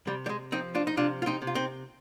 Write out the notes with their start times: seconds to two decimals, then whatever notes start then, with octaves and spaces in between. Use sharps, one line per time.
0.07 C3 G3
0.26 G3
0.29 G#3
0.52 F3 C4 D#4
0.75 D4 F4
0.87 D#4
0.97 C3 D4 F4
1.22 F4
1.26 C4 D#4
1.42 C3
1.47 F4
1.55 C4 D#4